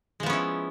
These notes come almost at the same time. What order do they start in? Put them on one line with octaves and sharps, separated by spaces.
G#3 F3 B3 C#4 E4